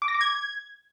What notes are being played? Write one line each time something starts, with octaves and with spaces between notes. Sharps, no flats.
D6
A#6
D6
G#6